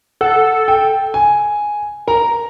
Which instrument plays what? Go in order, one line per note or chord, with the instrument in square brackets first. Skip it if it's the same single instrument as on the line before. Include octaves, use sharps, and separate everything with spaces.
[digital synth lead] A4 [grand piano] F#5
[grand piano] G5
G#5
[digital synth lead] A#4 [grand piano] A#5